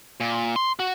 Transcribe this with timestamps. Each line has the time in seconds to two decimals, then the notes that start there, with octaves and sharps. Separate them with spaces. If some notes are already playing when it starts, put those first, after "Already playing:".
0.20 A#2
0.56 C6
0.79 F#4